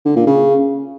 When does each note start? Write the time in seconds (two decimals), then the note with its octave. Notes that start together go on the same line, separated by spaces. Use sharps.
0.05 D3
0.16 A#2
0.26 C#3